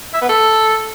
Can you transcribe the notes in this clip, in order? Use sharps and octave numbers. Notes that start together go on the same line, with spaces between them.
E5
B3
A4